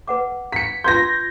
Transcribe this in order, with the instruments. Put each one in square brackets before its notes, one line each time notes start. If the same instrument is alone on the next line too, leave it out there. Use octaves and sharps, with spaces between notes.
[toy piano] B4 F#5 D6
[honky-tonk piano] B6 C#7
[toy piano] F4 B4 C6 [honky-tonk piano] G6 G#6 A#6